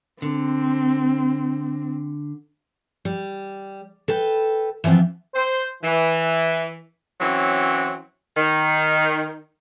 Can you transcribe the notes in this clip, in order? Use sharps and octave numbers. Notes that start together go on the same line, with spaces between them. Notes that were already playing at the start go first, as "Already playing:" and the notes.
D3 C4
G3
A4 B4 G5
E3 F3 B3 C4 F4
C5
E3
E3 F#3 C4 C#4
D#3